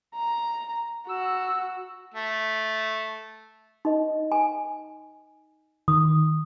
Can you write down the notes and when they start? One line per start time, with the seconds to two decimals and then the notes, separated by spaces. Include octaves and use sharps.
0.15 A#5
1.09 F#4 E6
2.14 A3
3.85 D#4 D#5
4.32 G#5
5.88 D#3 D#6